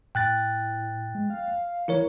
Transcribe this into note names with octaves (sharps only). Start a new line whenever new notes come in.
A2 G5 F#6 A6
G#3
F5
E3 E4 A#4 C#5